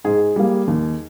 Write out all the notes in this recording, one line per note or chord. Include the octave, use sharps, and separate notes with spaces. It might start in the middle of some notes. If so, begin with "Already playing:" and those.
G#2 G#4
G3 A#3
D#2